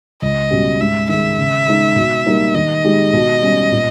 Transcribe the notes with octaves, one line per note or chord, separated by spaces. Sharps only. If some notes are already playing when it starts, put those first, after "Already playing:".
C#2 D#5
B2 G3 C#4 G4
G#2 E5
D#3 G#3 E5
C#3
G#3 D#4
B2
G3 A#3 D#4 G4
D#3 D#5
G#3 D#4 G4
B2
G3 C#4
A#2